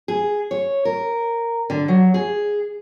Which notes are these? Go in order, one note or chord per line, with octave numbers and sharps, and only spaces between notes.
G#4
C#5
A#4
D3
F#3
G#4